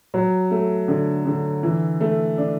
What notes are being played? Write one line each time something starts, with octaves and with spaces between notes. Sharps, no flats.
F#3
A3
D3
D3
E3
A3
D4